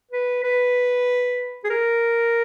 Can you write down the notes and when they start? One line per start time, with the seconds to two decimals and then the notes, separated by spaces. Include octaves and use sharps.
0.11 B4
0.43 B4
1.64 G#4
1.70 A#4